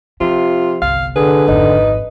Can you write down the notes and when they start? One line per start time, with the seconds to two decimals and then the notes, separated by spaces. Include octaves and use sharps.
0.21 C3 F3 F4
0.82 G1 C2 F5
1.16 D3 G#4 B4
1.48 G#1 F2 D#4